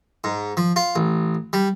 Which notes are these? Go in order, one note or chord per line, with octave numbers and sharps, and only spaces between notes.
G#2
F3
F4
A1
G3